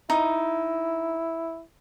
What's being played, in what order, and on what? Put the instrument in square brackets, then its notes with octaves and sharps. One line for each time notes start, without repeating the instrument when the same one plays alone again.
[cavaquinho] D#4 [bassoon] E4